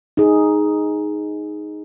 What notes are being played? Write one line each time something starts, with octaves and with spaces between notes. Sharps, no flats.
D#4 G#4